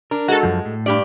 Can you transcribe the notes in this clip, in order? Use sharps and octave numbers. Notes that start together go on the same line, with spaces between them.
D4 A#4
G#3 F#4 A4
F#2 F3
A2
G2 G4 D5